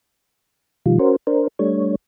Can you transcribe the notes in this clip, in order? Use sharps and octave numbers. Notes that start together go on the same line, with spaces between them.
B2 D#3 F3 G3 F4
C#4 F#4 A#4 C5
D4 A#4 C5
G3 A3 D4 C#5